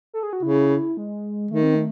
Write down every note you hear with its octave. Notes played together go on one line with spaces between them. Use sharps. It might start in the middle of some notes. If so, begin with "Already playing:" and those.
A4
G#4
F#4
C#3 E4
G#3
D#3 A3
C4
A3